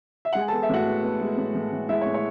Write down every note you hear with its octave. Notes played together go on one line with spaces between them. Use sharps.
E5
G#3 F#5
G#5
A4 A5
B3
E5
A2 F#4 F#5
B3
B3
G#3
A2
A2
A2
G#3 E4 E5
C#5
A2
C#5